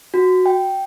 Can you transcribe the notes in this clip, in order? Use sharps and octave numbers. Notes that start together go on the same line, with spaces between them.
F#4
G5